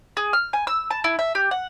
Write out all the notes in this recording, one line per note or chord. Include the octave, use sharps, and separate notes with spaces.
G#4
F6
G#5
E6
A5
E4
E5
G4
F#5